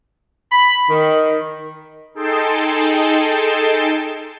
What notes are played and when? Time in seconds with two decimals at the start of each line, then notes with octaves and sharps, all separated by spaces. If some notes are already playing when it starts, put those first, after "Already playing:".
0.52 B5
0.90 D#3
2.14 D#4 G#4 A4 G5 A5 C6